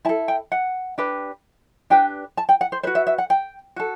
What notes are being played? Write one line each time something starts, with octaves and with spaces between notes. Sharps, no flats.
E4 A4 A5
G5
F#5
D4 G4 B4
D4 G4 B4 G5
A5
G5
F#5
C5
F#4 B4 C5
E5
E5
F#5
G5
F#4 A4